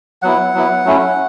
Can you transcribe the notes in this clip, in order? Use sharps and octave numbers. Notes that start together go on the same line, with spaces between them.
F#3 B3 E4 F#5
F#3 B3 E4
F#3 A3 C#4 E4